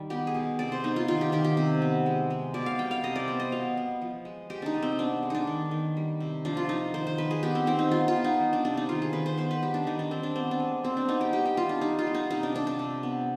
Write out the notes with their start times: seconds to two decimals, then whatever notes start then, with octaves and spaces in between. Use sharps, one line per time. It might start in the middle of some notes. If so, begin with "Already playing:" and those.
Already playing: D#3 G3
0.10 B3 G4
0.27 G#4
0.34 B2
0.59 C3 D5
0.72 C5
0.84 B3 D#4
0.96 F4
1.08 D#3 F4
1.21 G4
1.32 D#3 G4
1.44 G4
1.57 C3
1.82 B3
2.06 G#3
2.30 G#3
2.54 B2 D5
2.66 F5
2.79 G3 G5
2.91 F5
3.04 C3 D#5
3.16 D5
3.28 B3 C5
3.40 D#5
3.52 B2 F5
3.77 B3
4.02 F3
4.25 G#3
4.50 G#3 G4
4.62 D4 D#4
4.74 C3
4.82 C4
4.99 B3 D4
5.23 G#3
5.30 D4 D#4
5.47 D#3
5.71 D#3
5.97 G3
6.20 C3
6.45 F3 D4
6.57 F4
6.69 F3 D#4
6.94 D#3 C5
7.07 C5
7.18 D#3 B4
7.31 G#4
7.43 B3 G4
7.55 C4
7.67 D#3 C4
7.79 D#4
7.91 B3 F4
8.08 F4
8.16 B3
8.24 D#4
8.40 G3
8.53 D4
8.65 C3 D4
8.77 D#4
8.89 D#3 F4
9.02 G#4
9.13 D#3 B4
9.26 C5
9.38 B3 C5
9.51 B4
9.63 G3 G4
9.74 D4
9.87 D#3 D#4
9.99 D4
10.11 D#3 C4
10.23 D4
10.35 B3 C4
10.51 D4
10.60 G#3
10.84 B2 C4
10.97 D4
11.08 B3 D#4
11.21 G4
11.33 G3 G4
11.46 G4
11.57 G3 F4
11.69 D4
11.81 G3 D#4
11.99 F4
12.07 B3
12.15 D#4
12.31 C3 D#4
12.43 D4
12.55 C3 D4
12.67 D4
12.79 C3
13.03 B3